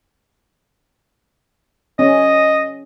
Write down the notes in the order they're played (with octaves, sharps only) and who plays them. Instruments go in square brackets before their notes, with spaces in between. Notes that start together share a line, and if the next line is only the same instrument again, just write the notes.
[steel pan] C#4 [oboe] D#5